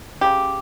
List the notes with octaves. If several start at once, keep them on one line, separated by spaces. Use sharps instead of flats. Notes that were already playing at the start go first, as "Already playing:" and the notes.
C#3 G4